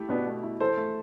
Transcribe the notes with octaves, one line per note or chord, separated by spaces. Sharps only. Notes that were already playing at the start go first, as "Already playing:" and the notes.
Already playing: A3 E4 G4
B2 B3 D4
A3
E4
E3 A4 C5
A3